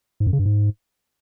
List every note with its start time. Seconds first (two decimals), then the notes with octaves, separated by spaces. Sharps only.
0.20 G#2
0.27 F#2
0.33 C#3
0.39 G2
0.46 G#2